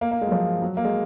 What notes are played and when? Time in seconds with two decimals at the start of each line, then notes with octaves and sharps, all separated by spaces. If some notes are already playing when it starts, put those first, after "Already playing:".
0.01 A#3
0.11 A#3
0.21 G#3
0.27 F#3
0.32 F3
0.62 F#3
0.77 A#3
0.84 G#3